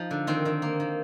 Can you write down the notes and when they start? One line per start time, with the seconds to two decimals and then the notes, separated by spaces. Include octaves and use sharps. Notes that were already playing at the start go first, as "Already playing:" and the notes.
Already playing: F3 D#4
0.11 D3
0.27 D#3 C4
0.45 D#3
0.62 A#3
0.80 D#3